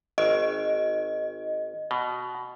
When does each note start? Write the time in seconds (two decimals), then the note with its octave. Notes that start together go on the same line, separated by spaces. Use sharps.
0.18 G#1 D#5
1.91 B2